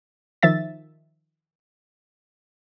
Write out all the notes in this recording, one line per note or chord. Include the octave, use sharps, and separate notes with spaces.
D#3 F3 E5 A6